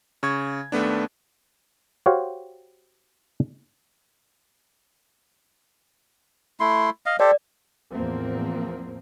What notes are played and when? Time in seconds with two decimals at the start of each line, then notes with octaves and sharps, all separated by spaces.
0.23 C#3 C#6 G#6
0.72 D#2 A3 B3 D4
2.06 F#4 G4 C5 C#5 F5
6.60 A3 E4 C6
7.06 D#5 F5
7.20 G4 A4 C5 D5
7.91 E2 A2 F3 A#3 C4